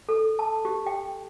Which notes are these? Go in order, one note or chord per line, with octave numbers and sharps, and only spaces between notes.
A4
A5
G4
G5